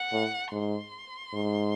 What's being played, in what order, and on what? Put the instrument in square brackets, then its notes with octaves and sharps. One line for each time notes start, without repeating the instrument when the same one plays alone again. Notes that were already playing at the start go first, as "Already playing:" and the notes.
Already playing: [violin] F#5
[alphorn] A2
[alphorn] G#2 [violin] C6
[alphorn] G#2